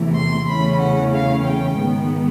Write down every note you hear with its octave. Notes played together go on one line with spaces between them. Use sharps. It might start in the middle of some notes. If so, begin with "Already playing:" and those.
Already playing: E2 C3 E3 A3
C6
E2 C#3 E3 A3 C#4 B5
F#5
F5
G5
G#2 D#3 G#3 B3